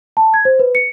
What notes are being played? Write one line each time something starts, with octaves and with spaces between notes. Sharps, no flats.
A5
G#6
C5
B4
C#7